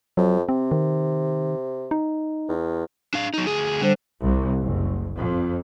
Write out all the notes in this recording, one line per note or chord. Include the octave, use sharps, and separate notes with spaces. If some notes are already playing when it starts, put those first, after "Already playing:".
F2 F#3
C3 C4
D#3
D#4
E2
D4 F5
F#3 D#4
D2 G#4
D3 G3 C5
C2
F#1
F2